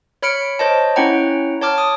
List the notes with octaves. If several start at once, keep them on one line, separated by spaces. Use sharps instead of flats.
C#5 B5 F6 C#7 D7
C5 C#5 D#5 A5
C#4 E4 C#5 F#5 G5 A#5
C#5 A5 D6 F6
D#6